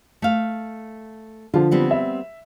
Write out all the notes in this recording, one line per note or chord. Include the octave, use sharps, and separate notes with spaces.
A3 F5
D3 F3 F4
G3 B3 C4
E5